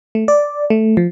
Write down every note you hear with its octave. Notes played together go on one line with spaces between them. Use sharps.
A3
D5
A3
F3